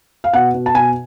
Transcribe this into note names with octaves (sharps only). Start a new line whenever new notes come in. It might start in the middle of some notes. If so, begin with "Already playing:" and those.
F5
B2 F#5
B2
A5
B2 G#5